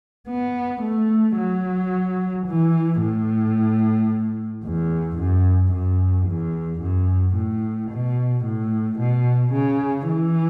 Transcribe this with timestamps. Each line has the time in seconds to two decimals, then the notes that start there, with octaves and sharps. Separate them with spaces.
0.29 B3
0.83 A3
1.37 F#3
2.46 E3
3.00 A2
4.64 E2
5.19 F#2
5.73 F#2
6.28 E2
6.82 F#2
7.36 A2
7.91 B2
8.45 A2
8.99 B2
9.53 C#3
10.08 E3